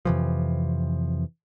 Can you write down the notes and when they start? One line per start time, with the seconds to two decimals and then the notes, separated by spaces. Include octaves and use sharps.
0.05 F2 C3 E3 F3